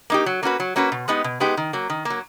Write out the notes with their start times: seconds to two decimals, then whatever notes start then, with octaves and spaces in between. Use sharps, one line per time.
0.10 A#3 D#4 G4
0.26 F#3
0.43 A#3 C#4 F#4 B4
0.60 F#3
0.76 A#3 C#4 F#4 B4
0.92 B2
1.08 G#3 B3 D#4 G4
1.24 B2
1.40 G#3 B3 D#4 G4
1.57 D#3
1.73 F#3 A#3
1.90 D#3
2.05 A#3
2.10 F#3